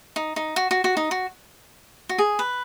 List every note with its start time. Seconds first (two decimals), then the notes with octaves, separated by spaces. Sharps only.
0.16 D#4
0.36 D#4
0.56 F#4
0.71 F#4
0.84 F#4
0.97 D#4
1.11 F#4
2.09 F#4
2.18 G#4
2.39 B4